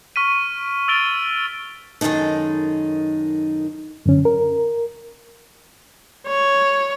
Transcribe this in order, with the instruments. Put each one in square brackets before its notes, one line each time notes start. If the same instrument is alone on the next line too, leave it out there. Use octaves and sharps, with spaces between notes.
[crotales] C#6 F6 B6 D#7
E6 F6 A6 D7 F7 G7
[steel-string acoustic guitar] F#2 D#3 G#3 D#4 A4
[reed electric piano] F#2 D3 C#4
A#4
[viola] C#5